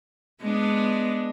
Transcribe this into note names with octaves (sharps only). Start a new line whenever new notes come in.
G#3 B3 D4